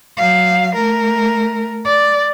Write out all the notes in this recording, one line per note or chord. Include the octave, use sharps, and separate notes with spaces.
F#3 F5
A3 A#4
D5